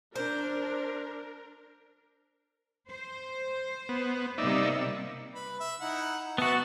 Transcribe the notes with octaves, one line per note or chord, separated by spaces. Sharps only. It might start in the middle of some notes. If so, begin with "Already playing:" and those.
D4 A#4 C5
C5
B3
C3 G3 A#3 D#4 D5 E5
B4 B5
E5
D#4 E4 F#5
B3 F#4 E5 A5